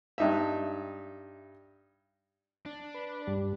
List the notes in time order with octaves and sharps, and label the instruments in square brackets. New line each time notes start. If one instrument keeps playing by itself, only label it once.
[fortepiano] G2 D#4 E5
[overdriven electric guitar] D4
[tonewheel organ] B4
G2 G3